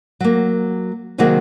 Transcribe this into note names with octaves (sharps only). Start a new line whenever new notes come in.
F#3 A#3
C3 D#3 F#3 A#3 F#4 G#4